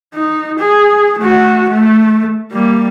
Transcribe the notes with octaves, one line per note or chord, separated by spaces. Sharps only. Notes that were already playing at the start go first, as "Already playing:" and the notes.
D#4
G#4
A3 F#4
A3
G3 A#3